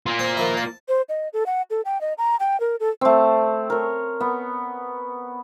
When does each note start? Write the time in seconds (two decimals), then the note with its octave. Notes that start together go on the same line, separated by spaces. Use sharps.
0.06 A#3 F4
0.19 C4 G5
0.37 D#3 F3 E4
0.57 A5
0.88 C5
1.09 D#5
1.33 A4
1.46 F#5
1.70 A4
1.85 G5
2.01 D#5
2.18 A#5
2.40 G5
2.60 A#4
2.80 A4
3.01 A3 C4
3.70 A#4 C#5
4.21 B3